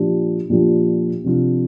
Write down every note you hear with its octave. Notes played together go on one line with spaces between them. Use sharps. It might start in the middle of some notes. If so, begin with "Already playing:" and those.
Already playing: A#2 F3 D4 G4
A#2 F3 D4 G4
C3 F3 D4 F4